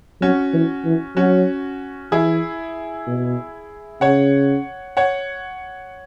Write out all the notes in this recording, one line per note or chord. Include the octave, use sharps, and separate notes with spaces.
F#3 C#4 F#4
E3
E3
F#3 C#4 F#4
E3 E4 G#4
B2
C#3 C#5 F#5
C#5 F#5